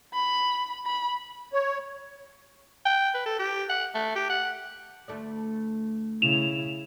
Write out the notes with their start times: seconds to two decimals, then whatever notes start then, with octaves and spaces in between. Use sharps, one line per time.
0.14 B5
0.86 B5
1.53 C#5
2.86 G5
3.14 B4
3.26 A4
3.39 G4
3.69 F#5
3.94 A3
4.15 G4
4.30 F#5
5.08 D2 A3 D5
6.22 C#3 E4 E7 F7